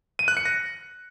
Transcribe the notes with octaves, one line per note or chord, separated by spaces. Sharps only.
D#7
F#6
C#7
A#6